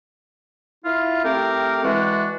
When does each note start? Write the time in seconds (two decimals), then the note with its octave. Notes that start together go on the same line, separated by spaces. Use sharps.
0.85 E4 F4
1.25 A3 C4 G4 A#4
1.84 E3 G#3 D4 F#4